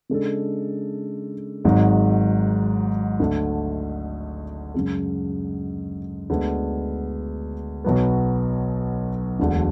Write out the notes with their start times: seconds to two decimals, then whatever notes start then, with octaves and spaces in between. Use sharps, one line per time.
0.09 C#3 G#3 D4 A4
1.65 G#1 G#2 F#3
3.20 D2 D3 A3
4.74 F#2 C#3 G#3
6.30 D2 D3 G#3 B3 D4
7.84 B1 B2 F#3 B3
9.39 E1 D2 D3